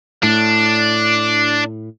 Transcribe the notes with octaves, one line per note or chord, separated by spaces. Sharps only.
A2 D4